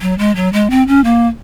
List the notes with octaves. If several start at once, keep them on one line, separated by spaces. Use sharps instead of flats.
F#3
G#3
F#3
G#3
C4
C#4
A#3